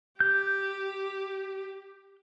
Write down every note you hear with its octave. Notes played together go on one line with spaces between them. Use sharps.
G4 G6